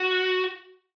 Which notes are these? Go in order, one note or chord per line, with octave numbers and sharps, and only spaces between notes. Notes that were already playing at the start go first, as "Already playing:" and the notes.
Already playing: F#4